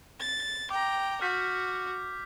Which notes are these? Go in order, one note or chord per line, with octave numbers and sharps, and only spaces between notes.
A6
G5 A#5 D6
F#4 F6 G6 B6